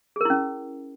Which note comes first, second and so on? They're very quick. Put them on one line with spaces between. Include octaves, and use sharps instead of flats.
G#4 A#4 E4 C#4